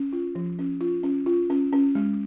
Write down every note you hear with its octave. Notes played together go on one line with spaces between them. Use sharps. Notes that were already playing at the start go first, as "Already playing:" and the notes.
Already playing: C#4
F4
F3
C#4
F4
C#4
F4
C#4
C#4
G#3